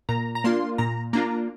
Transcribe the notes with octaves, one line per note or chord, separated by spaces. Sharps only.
A#2 A#5
A#5
A#3 D4 F4 C6
A#2 A#5
A#3 D4 F4 A#5